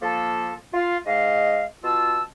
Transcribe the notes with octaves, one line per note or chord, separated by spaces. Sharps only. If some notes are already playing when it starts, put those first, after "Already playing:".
F3 A#3 A4
F4
G#2 G#3 D#5 F5
B2 F4 A5 E6